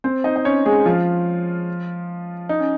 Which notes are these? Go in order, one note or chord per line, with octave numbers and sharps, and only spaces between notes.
C4 C5
D#4 D#5
D#5
C#4 C#5
G#3 G#4
F3 F4
D#4
C#4